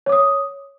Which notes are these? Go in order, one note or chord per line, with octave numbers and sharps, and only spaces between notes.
C#5 D6 D#6